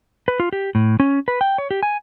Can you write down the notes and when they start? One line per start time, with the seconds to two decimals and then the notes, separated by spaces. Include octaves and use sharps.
0.28 B4
0.40 F4
0.53 G4
0.75 A2
1.00 C#4
1.28 B4
1.41 G5
1.58 C#5
1.71 G4
1.83 G#5